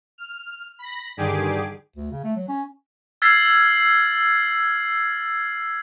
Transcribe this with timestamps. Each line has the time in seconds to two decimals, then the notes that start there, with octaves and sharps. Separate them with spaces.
0.18 F6
0.79 B5 A#6
1.17 G2 D3 D#3 G4 G#4 D6
1.96 D2
2.11 C#3
2.24 A3
2.36 F#3
2.48 C#4
3.22 E6 F6 G#6 A6 B6 C7